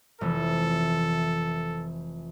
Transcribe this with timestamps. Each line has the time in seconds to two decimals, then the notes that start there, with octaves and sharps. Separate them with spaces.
0.21 F1 E3 A4